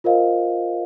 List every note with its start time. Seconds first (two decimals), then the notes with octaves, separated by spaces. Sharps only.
0.04 F4 A#4 C5 D#5 F5